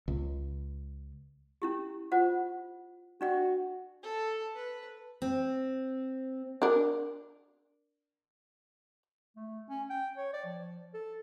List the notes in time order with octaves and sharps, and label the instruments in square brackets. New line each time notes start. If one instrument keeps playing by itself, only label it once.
[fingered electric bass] C#2
[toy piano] C#4 E4 G4
F4 C5 F#5
[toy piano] D4 D5 G5 [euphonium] F#4
[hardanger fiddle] A4
B4
[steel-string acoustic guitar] C4
[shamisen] D4 A#4
[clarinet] A3
C#4
G5
C#5
D5
F3
A4